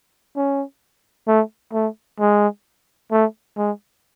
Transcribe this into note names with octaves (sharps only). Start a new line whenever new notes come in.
C#4
A3
A3
G#3
A3
G#3